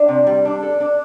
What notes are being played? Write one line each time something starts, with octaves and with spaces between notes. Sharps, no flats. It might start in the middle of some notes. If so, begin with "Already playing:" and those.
Already playing: D4
C3
G3
D4
A4
D4